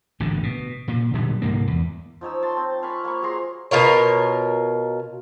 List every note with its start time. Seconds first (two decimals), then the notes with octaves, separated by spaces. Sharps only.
0.20 A1 D2 G#2 D3
0.43 B2
0.88 A#2
1.14 A#2 D3 F#3 G3
1.42 C2 G#2 D#3 A#3
1.67 E2
2.21 F3 D#4 C#5 E6
2.43 A5 C6
2.57 C4
2.83 F5 G#5 B5 C#6
3.04 A#3 C#5 B5 C#6
3.22 F#3 G#4 A#5 C6
3.71 B2 F4 A#4 C#5